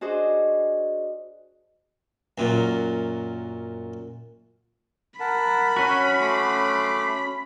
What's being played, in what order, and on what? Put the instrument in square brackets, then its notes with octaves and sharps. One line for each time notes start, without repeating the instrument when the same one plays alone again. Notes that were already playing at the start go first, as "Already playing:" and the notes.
[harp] D4 F#4 G#4 C5 D#5
[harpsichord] F#2 A#2
[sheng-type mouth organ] A#4 F#5 A5 [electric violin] B5
[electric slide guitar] C#4 F#4
[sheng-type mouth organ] A3 C6 D6